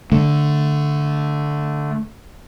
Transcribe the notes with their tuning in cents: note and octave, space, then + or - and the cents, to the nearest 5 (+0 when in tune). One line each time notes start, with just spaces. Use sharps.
D3 +0 A3 +0